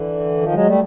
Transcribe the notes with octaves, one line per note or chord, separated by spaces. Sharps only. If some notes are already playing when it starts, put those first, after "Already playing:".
Already playing: D3 E3
D#3 F3
F#3 G#3
G3 A3